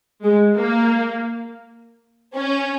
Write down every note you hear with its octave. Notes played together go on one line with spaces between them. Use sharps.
G#3
A#3
C#4